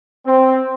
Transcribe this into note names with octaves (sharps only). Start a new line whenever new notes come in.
C4